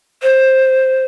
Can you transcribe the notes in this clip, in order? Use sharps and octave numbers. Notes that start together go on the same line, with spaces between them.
C5